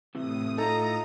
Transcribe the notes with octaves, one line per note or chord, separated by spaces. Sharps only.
A2 C3 E3 D#6
D#4 F4 A4 A#5